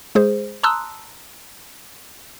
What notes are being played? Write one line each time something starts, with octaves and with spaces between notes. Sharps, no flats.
G#3 G#4 C5
A5 A#5 C6 D#6 E6 F#6